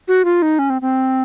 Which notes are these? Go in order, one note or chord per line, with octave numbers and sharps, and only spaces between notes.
F#4
F4
D#4
C#4
C4
C4